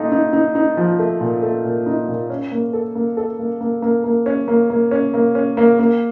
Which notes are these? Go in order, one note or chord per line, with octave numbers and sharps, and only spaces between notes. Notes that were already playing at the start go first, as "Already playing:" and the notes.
Already playing: A#2 A3 D#4
D#4
D#4
D#4
F3
A3
A#2
A3
A#2
D#4
A#2
C#4
A#3
A4
A#3
A4
A#3
A#3
A#3
A#3
C#4
A#3
A#3
C#4
A#3
C#4
A#3
A#3